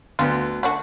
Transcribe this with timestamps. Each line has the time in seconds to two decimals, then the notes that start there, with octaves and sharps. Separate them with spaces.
0.19 D2 B3 F4
0.63 A3 D4 F#4